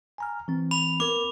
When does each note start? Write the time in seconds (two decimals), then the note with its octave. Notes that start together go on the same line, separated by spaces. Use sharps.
0.18 G#5 A#5 F6
0.48 E3 C4
0.71 B5 F7
1.00 B3 A#4 D6